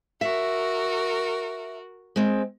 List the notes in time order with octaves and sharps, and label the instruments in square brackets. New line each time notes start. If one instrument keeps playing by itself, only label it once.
[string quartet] F#4 A#4 [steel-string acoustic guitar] E5
[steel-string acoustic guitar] G#3 C4